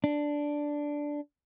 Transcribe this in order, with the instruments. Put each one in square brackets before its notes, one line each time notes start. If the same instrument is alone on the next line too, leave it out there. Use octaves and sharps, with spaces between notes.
[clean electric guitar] D4